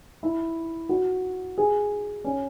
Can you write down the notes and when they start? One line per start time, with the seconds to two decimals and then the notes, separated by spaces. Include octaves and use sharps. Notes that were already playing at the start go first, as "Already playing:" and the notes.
0.23 E4
0.89 F#4
1.58 G#4
2.24 C#4